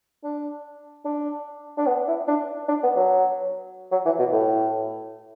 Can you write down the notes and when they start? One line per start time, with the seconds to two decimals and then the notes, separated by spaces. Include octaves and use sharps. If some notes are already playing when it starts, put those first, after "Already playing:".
0.24 D4
1.05 D4
1.78 D4
1.87 B3
2.08 E4
2.28 D4
2.69 D4
2.83 B3
2.96 F#3
3.92 F#3
4.06 E3
4.19 B2
4.33 A2